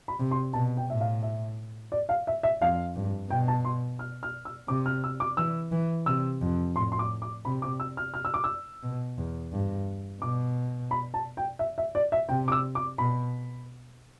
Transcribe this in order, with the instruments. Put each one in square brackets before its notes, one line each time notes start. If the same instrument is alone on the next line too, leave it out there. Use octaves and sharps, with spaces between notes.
[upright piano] B5
[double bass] C3
[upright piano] C6
[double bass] B2 [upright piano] A5
[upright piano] G5
[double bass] A2 [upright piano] E5
[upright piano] F5
E5
D5
F5
E5
E5
[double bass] F2 [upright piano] F5
[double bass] G2
[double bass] B2 [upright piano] G5
[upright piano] A5
C6
F6
F6
E6
[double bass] C3 [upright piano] D6
[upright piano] F6
E6
D6
[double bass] E3 [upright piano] E6
[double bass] E3
[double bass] C3 [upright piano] E6
[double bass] F2
[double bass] A2 [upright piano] C6
[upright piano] C6
D6
D6
[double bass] C3 [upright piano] B5
[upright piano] D6
E6
F6
F6
E6
D6
E6
[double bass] B2
E2
G2
[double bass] B2 [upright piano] D6
[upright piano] B5
A5
G5
E5
E5
D5
E5
[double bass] C3 [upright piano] G5
[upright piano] D6
E6
D6
[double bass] B2 [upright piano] B5